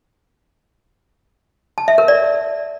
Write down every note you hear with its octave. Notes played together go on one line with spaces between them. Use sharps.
A5
E5
A#4
D5